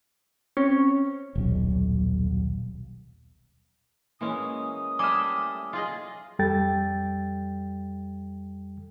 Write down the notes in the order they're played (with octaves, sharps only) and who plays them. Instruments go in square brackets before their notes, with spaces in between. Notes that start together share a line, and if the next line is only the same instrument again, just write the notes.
[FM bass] C4 [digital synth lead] C#4
[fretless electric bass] D#1 B1
[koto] E3 G#3 C#4 [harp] A#3 [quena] D#6
[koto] G3 A3 [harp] E5 G#5 [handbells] D6 F6
[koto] F4 G#4 D#5
[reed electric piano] F2 G3 A4 G5 A6